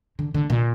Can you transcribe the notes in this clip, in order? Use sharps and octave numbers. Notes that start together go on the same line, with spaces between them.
D3
D3
A#2